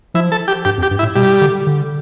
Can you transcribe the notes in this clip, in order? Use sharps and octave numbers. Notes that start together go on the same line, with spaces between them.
F3 E4
A4
G4
G2 G4
F2
G4
G2
E4
A2
B2 G3
D3
D3